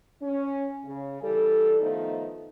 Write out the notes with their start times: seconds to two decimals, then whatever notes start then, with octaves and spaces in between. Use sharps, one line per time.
0.22 C#4
0.85 C#3
1.23 E3 G3 A4
1.81 D#3 F3 A3 B3 D#4